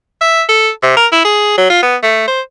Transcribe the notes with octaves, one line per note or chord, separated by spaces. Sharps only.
E5
A4
C3
A#4
E4
G#4
F#3
F4
B3
A3
C5